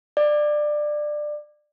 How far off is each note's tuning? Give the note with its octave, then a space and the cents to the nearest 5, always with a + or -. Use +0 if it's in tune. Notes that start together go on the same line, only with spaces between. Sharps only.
D5 +20